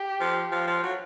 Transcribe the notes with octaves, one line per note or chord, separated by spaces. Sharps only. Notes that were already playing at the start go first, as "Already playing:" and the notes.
Already playing: G4
F3
F3 F4
F3
F#3